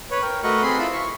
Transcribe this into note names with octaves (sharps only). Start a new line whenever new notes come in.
B4 C#5
A#4 G5
A3 F#4 A#4 B4 D#5 C#6
C4 G#4 B5 C6
E4 F4 A5 B5
C#6